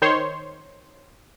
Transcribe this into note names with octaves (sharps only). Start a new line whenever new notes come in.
D#3 C5 C#5 C6